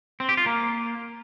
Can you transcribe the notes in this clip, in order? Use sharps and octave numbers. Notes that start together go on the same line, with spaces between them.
C4
G4
F4
A#3